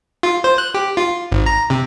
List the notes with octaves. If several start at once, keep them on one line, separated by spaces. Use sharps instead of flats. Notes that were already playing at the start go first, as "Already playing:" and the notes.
F4
C5
F#6
G4
F4
G#1
A#5
C3